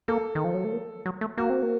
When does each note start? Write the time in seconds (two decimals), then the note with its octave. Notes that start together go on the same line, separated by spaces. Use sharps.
0.08 A#3 A4
0.35 D#3
0.44 F3
0.54 F#3
0.64 A3
0.73 A#3
1.06 F#3
1.21 A3
1.38 A#3 F#4
1.50 C4
1.63 A#3